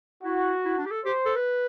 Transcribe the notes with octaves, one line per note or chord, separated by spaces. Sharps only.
E4 F#4
E4
D4
G4
A4
G4 C5
A4
B4